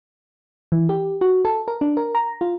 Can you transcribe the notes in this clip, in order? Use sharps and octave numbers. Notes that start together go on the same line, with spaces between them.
E3
G4
F#4
A4
A#4
D4
A#4
A#5
F4